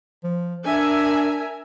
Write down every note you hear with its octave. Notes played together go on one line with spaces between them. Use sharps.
F3
D4 A#4 E5 G#5